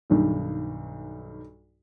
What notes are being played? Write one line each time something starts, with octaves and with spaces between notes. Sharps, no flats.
B1 G2 D#3